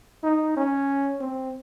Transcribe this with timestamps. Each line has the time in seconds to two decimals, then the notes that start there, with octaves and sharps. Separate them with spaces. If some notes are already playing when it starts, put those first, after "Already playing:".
0.24 D#4
0.57 C#4
1.21 C4